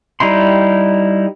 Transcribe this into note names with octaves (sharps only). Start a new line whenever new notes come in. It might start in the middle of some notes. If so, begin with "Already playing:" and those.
G3 D#4 E4 C6